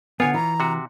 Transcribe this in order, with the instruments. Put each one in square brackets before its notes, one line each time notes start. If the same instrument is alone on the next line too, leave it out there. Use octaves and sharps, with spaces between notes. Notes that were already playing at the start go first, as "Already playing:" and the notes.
[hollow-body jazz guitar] D3 B3 [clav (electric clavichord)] F4 C#5 [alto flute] G#5
[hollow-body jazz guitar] E3 [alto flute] A#5
[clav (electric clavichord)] C3 F#4